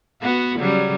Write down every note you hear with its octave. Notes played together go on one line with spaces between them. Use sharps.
B3 F#4
C#3 F#3 G3